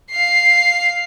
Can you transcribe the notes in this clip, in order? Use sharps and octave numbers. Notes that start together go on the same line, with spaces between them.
F5 C7